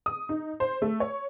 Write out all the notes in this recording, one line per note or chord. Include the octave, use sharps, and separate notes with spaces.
D#6
D#4
C5
A3
C#5